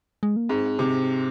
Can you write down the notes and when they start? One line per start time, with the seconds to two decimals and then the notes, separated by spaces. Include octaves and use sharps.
0.23 G#3
0.36 A#3
0.49 G#2 C4
0.79 C3